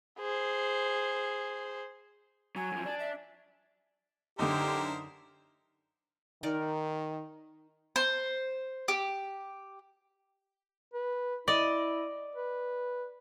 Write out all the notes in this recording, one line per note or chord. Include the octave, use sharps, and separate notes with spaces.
G#4 C5
F#3 G#5
F#2 F3
D4
E5
F#2 D3 D#4 G4 A#4 C5 E5
D#3 D#4 A#4 D5
C5
G4
B4
E4 D5 D#5
B4